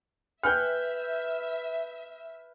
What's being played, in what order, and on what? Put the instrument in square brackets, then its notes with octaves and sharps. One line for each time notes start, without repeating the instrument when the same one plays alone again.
[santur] B4 [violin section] E5 [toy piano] G5 G#5 [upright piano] F6 G6